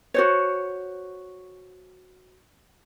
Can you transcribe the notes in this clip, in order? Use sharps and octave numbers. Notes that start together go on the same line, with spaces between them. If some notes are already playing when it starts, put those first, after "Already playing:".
F#4 C5 C#5